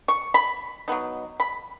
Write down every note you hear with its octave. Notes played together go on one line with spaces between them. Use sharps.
C#6
B5
F#3 B3 D#4
B5